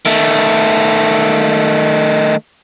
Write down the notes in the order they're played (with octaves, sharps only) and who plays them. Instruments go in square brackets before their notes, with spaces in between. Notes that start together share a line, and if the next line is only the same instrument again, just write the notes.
[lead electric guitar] D#3 A3